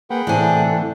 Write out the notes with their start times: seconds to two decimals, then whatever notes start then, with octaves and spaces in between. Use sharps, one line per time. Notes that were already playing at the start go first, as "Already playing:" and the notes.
0.10 A#3 G#4 B4 F#5 G5
0.27 A2 C3 E3 A3 D4 G#5